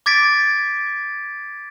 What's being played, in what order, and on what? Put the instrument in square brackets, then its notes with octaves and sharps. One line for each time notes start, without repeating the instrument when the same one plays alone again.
[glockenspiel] D6 G#6 A6 B6 D7